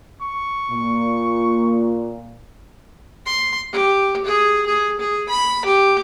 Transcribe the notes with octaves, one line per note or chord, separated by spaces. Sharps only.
C#6
A#2
C6
G4
G#4
G#4
G#4
B5
G4